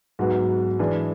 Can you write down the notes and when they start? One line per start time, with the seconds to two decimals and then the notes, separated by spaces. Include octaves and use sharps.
0.19 G#2 F#3 B3 F#4
0.79 E3 G#3 D4 G#4